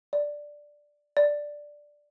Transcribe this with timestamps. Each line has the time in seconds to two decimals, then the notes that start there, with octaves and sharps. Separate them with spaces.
0.13 D5
1.17 D5